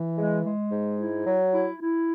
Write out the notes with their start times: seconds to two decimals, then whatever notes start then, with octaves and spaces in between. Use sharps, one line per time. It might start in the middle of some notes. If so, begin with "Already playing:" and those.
Already playing: E3
0.18 G#3
0.45 G#3
0.72 G#2
1.00 E4
1.27 F#3
1.54 E4
1.81 E4